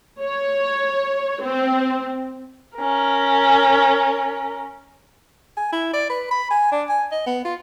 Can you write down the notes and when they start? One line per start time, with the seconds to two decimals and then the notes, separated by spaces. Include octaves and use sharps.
0.21 C#5
1.42 C4
2.77 C#4 A#4
5.57 G#5
5.72 E4
5.93 D5
6.10 B4
6.31 B5
6.51 G#5
6.72 D4
6.89 G#5
7.12 D#5
7.26 B3
7.45 F4